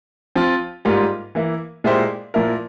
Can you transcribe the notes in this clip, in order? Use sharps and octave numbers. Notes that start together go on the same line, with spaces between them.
F3 C4 F4
G#2 G3 A#3 F4
E3 A#3 E4
A#2 G#3 E4 G4 C5
A#2 F3 A#3 E4 A#4